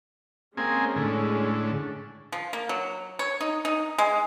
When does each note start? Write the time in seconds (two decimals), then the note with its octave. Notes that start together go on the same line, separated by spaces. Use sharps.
0.57 G#3 A#3 C4 C#4 G#4
0.96 A2 D3
2.32 F3
2.53 A#3
2.69 F#3
3.19 C#5
3.41 D#4
3.65 D#4
3.98 G#3